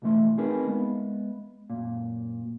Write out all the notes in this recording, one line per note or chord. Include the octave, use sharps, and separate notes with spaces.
B1 E2 E3 A3 C6
C4 D#4 G#4 A#4 B4
G#3 B3
F#2 A#2